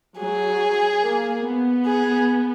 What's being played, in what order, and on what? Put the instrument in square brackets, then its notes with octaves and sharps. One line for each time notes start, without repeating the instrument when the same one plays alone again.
[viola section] F#3 [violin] G#4
[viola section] A#3
B3
[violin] G#4